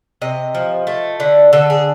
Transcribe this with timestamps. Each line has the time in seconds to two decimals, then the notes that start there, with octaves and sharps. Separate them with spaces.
0.22 C3 D#5
0.55 F3
0.87 A3
1.20 D3
1.53 D3 A4
1.70 G#4